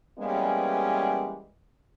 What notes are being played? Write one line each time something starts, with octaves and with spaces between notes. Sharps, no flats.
E3 G3 G#3 A#3 B3 C#4